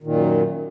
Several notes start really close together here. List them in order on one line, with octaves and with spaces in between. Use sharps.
D#3 A#2 F#2